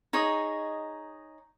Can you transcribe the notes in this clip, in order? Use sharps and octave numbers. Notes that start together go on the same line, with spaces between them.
D#4 G#4 C#5 D#5